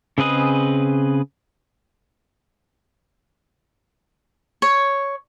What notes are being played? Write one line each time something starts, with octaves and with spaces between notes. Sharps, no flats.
C#3 C4 G#4 B4 D#5
C#5